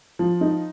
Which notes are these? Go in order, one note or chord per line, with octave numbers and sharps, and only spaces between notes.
F3
D#4